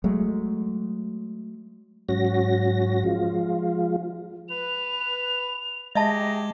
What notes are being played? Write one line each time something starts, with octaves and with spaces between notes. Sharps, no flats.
F#3 G#3 A3
G#2 F#3 C#4 F#4 A#6
F3 G#3 F4
B4 F7
G#3 G4 G#4 D#5 E5 A5 A#6